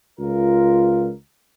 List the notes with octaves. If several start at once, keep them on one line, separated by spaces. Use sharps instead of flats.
C#2 F4 A#4